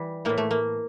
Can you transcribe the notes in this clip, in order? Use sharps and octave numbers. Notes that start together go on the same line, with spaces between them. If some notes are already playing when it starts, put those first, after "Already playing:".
Already playing: E3 G3
A2 E3 A#3
A3
A#3